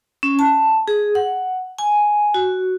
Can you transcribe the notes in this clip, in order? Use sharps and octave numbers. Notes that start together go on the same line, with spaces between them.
C#4
A5
G#4
F#5
G#5
F#4